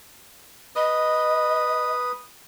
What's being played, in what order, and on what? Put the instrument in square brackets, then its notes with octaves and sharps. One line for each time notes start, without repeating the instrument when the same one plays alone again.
[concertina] B4 D#6 [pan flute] D#5